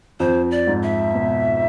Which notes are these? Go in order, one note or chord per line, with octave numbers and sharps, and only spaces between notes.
F2 C5
D5
G#2
E5
B2